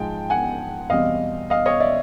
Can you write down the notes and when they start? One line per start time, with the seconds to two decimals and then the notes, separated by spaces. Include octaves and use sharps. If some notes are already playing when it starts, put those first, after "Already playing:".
Already playing: G#2 F3 G#3 G5 A5
0.30 F#5 G#5
0.90 E2 B2 G3 C4 D#5 F5
1.50 D#5 F5
1.66 C#5 D#5
1.80 D5 E5